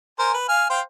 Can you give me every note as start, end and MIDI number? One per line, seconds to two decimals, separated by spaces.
0.19 0.34 70
0.19 0.34 72
0.19 0.34 80
0.34 0.48 71
0.49 0.65 77
0.49 0.65 80
0.49 0.65 89
0.70 0.81 72
0.70 0.81 77
0.70 0.81 79